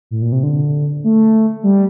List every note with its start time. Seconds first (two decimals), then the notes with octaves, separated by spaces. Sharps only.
0.11 A2
0.22 A#2
0.32 C3
0.43 D3
1.04 A3
1.63 G3